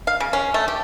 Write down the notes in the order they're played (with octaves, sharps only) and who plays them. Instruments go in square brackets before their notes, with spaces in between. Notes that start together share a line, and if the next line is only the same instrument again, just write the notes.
[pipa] F5
C#3
C#4
A3
G4